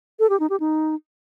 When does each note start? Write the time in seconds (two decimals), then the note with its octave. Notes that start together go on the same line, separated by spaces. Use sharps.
0.19 A4
0.30 G4
0.40 D#4
0.50 G4
0.60 D#4